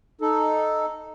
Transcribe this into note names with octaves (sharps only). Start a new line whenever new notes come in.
D#4 A4